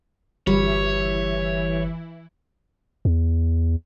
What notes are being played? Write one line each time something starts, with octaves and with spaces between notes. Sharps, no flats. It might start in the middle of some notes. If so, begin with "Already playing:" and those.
G1 E3 G3 E4 C#5
E2